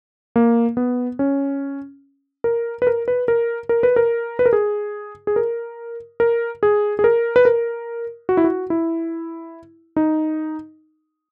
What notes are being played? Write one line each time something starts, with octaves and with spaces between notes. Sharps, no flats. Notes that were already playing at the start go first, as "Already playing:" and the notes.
A#3
B3
C#4
A#4
B4
A#4
B4
A#4
A#4
B4
A#4
B4
A#4
G#4
G#4
A#4
A#4
G#4
G#4
A#4
B4
A#4
F#4
E4
F#4
E4
D#4